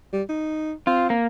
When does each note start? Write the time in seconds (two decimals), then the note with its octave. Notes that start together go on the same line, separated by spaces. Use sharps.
0.13 G3
0.29 D#4
0.87 C4 F4
1.10 A#3